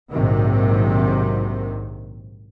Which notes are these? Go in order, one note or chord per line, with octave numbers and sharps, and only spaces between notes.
A#1 G#2 C3 D#3 F#3